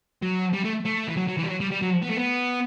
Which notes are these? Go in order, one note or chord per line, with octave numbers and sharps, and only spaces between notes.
F#3
G3
A3
A3
E3
F#3
F#3
E3
G3
F#3
G3
G3
F#3
B3
A3
B3